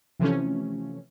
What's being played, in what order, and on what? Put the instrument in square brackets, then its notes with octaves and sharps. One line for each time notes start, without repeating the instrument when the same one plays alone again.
[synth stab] C3 E3 F3 A3 C#4